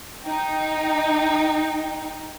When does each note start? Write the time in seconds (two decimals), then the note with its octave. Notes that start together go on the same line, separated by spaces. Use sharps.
0.22 D#4 G5